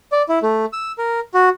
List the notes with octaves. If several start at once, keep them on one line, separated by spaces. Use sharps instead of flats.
D5
E4
A3
E6
A#4
F#4